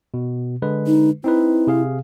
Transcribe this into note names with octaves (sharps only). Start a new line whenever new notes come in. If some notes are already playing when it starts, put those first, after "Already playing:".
B2
D3 G#3 B4
D#4
C4 D#4 E4 B4
C3 G#4 F5